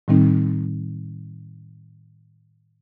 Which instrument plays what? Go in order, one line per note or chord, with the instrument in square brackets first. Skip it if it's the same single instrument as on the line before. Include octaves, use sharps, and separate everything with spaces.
[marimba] A2 D#3 G3 C4 D#4